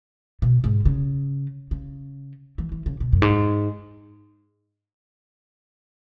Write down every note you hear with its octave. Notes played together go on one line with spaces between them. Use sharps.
B2
G#2
C#3
C#3
E3
E3
C#3
B2
F#2
G#2